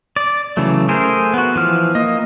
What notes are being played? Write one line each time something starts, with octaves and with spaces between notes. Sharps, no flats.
D5
C#3 E3 F#3 A3
A3 G#4 A#4 C5
B3 F#4
E3 F3 F6
A#3 D#5